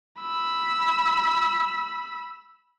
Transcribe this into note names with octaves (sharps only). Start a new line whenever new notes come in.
B5 E6